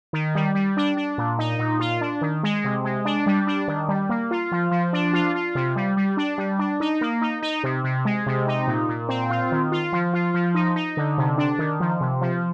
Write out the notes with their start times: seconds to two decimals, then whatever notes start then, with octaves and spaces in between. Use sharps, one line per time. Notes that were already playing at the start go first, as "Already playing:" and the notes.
0.13 D#3
0.35 G3
0.55 G3
0.77 D4
0.97 D4
1.18 A#2
1.39 D#4
1.59 A#2
1.80 F4
2.01 D4
2.21 D#3
2.43 G#3
2.64 C3
2.84 G#3
3.05 D4
3.26 G3
3.47 D4
3.68 D#3
3.89 G3
4.09 A#3
4.31 F4
4.52 F3
4.71 F3
4.93 D4
5.13 F4
5.35 F4
5.55 C3
5.76 G3
5.97 G3
6.17 D4
6.38 G3
6.59 D4
6.80 D#4
7.01 A#3
7.22 D#4
7.43 D#4
7.63 C3
7.84 C3
8.05 G#3
8.26 C3
8.47 D#4
8.67 A#2
8.89 A#2
9.09 C4
9.30 F4
9.52 D#3
9.72 F4
9.92 F3
10.13 F4
10.34 F3
10.55 D#4
10.76 D#4
10.97 D3
11.18 C3
11.38 D4
11.59 D#3
11.80 F3
12.01 C3
12.22 F3